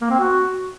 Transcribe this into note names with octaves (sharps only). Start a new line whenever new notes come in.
A#3
C4
F#4